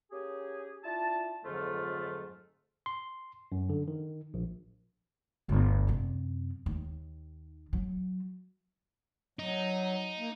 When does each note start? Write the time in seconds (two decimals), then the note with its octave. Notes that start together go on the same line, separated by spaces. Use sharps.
0.11 A#3 C#4 G4 G#4
0.84 D4 E4 F4 A5
1.45 F2 G#2 D3 F#3 A3 F4
2.86 C6
3.52 F#2
3.69 D3
3.88 D#3
4.34 A#1
5.48 G1 D2
5.87 F#2 C3
6.66 D#2 D#3
7.73 F#3
9.39 F#3 D#4
10.19 A#3